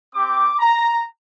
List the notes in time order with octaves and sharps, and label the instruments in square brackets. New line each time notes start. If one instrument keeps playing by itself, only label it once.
[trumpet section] C4 G4 D6
A#5